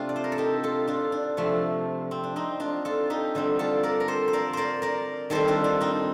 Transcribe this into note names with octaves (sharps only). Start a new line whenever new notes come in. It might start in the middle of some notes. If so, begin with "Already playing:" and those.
Already playing: C3 A3 C4 D4 F4
D5
C5
A#4
A4
D#4 G4
F4 A4
D4 F4
D4
C3 F3 A3
C4
D4
C4 D#4
D4 F4
F4 A4
D#4 G4
D3 G3 C4
F4 A4
A#4 D5
A#4
A4 C5
C5
A#4 D5
A#4 C5 D5
A#4 D5
D#3 G3 C4 A4 C5
D4 F4
D4
C4 D#4